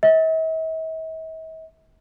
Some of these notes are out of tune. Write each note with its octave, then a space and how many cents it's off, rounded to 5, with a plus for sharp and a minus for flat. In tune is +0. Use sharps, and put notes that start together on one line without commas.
E5 -45